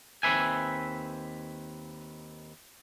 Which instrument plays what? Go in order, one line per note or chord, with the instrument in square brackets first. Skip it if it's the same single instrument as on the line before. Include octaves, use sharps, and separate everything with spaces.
[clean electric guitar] D#2 C4 B4 E5 G#5